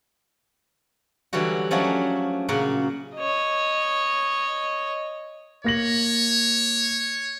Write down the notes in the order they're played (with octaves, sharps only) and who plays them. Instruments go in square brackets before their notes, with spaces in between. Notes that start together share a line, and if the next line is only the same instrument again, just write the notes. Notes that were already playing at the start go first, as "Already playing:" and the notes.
[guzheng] D3 E3 F#3 G3 F#4
F3 F#3 A3 C#4 D4 F#4
A#2 C#3 F#3 F#4 F#5
[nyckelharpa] C#5 D#5
[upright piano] A#3 A#6 F#7 [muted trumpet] C#5